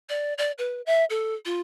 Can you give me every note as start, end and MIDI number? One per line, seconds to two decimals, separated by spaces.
0.09 0.34 74
0.38 0.52 74
0.58 0.81 71
0.86 1.05 76
1.10 1.34 69
1.45 1.61 65